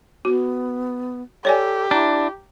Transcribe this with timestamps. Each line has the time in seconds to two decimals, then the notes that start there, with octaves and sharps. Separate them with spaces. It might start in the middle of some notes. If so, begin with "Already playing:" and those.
0.25 B3 F#4
1.45 G4 A4 C#5 D5 G#5
1.91 D4 E4 A#5